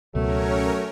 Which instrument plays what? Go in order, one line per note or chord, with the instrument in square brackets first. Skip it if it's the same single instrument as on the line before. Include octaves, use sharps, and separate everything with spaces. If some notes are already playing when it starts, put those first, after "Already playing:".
[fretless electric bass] C#2 B2 [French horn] F#3 [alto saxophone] A3 [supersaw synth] C#4 A#4 C#5